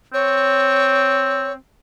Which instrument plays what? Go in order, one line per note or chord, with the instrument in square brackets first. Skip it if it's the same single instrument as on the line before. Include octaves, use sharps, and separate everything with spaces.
[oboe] C4 [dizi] C#5